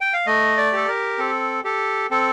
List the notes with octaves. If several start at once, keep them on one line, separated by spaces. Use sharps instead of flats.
G5
F5
A3 D#5
D5
G4 A4
A#4
C4 A4
G4 A4
C4 A4